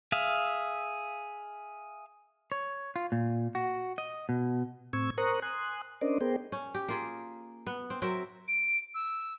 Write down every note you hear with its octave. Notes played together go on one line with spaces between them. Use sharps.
G#4 E5 F5
C#5
F4
A#2
F#4
D#5
B2
A2 C4 C#6 E6 G#6
A#4 C5 A#5 C#6 D#6 F#6
G#5 C6 D#6 F#6
C#4 D4 A#4 C5 D5 D#5
B3 G#4 A#4 C5 G5
C#4
G4
A#3 F4 G#4
B3
C4
F#3 C4 A#4 E5
D7
E6